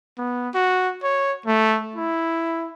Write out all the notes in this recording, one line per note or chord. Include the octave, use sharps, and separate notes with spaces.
B3
F#4
C#5
A3
E4